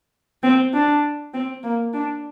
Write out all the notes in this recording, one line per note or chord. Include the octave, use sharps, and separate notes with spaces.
C4
D4
C4
A#3
D4